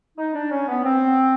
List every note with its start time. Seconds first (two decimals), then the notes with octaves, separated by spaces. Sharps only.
0.18 D#4
0.34 D4
0.51 C#4
0.68 B3
0.84 C4